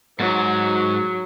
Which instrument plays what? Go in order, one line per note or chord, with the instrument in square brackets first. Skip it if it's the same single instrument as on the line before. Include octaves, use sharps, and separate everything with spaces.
[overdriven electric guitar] G#2 [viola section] F#3